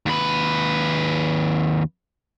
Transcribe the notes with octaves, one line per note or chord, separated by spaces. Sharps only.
D#2 B4